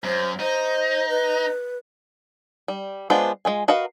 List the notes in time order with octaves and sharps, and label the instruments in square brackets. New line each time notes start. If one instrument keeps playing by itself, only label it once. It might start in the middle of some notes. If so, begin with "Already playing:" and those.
[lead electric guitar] F#2 [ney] C5
[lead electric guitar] D#4 [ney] C5
[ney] B4
[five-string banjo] G3
G#3 B3 D4 F4 C5
G#3 F4 G#5
F#4 A#4 B4 D#5 F5